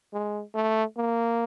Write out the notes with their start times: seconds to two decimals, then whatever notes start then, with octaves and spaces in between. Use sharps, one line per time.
0.13 G#3
0.55 A3
0.97 A#3